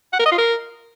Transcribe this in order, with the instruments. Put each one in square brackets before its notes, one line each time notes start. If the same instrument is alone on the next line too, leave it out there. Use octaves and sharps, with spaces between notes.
[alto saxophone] F#5
A#4
D#5
F4
A#4